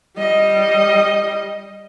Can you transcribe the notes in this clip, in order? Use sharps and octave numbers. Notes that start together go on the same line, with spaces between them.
G3 D#5